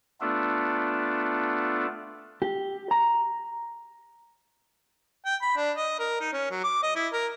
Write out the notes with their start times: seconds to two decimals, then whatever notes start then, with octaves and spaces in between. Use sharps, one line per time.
0.21 A3 B3 D4 F4 A4
2.42 G4
2.91 A#5
5.26 G5
5.42 B5
5.57 D4
5.77 D#5
5.99 A#4
6.21 D#4
6.33 C#4
6.51 F#3
6.64 D6
6.83 D#5
6.96 E4
7.13 A#4